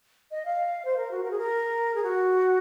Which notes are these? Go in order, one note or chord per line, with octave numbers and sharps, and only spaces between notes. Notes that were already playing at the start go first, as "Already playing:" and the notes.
D#5
F5
C5
A#4
F#4
A#4
G#4
A#4
G#4
F#4